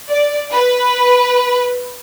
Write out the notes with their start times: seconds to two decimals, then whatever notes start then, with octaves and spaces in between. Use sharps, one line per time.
0.10 D5
0.53 B4